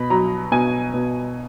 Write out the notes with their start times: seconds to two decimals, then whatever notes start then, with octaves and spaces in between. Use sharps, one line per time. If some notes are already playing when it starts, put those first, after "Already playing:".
Already playing: B2 B5
0.10 F#3 A#5
0.52 B2 G#5
0.94 B2